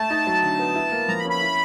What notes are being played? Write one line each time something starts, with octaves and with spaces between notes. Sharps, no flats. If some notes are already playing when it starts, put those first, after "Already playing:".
Already playing: A3 A5
D#4
F#3
D3
B3
E4
A#3
F3 A#5
B5
C#4
B5
E4